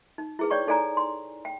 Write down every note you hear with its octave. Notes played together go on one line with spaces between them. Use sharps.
D#4
E4 G#4 B4
C#5 D5 G5 C#6
D#4 A4 D5 G#5 A#5
C6
G5